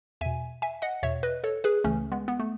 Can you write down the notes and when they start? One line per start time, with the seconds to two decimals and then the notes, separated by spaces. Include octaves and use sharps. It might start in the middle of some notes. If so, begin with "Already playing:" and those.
0.21 E2 B2 E5 G#5
0.62 E5 G#5
0.82 D#5 F#5
1.03 E2 B2 C#5 E5
1.23 B4 D#5
1.44 A4 C#5
1.64 G#4 B4
1.84 C#2 C#3 E3 A3 C#4
2.12 G#3 B3
2.28 B3
2.40 A3